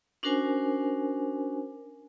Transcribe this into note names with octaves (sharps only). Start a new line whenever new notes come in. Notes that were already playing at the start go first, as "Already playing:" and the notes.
C#4 D4 F#4 A#4 C5 G#5